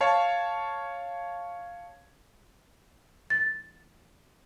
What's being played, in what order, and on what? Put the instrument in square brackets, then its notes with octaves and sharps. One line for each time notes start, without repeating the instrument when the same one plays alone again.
[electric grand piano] C#5 F5 A5
[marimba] A6